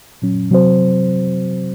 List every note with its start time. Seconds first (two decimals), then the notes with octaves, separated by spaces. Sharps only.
0.22 A#2 F#3 C#4
0.50 C3 F#3 C4 F#4 C5